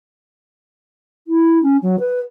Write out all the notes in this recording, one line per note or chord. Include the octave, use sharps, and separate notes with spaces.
E4
C#4
F#3
B4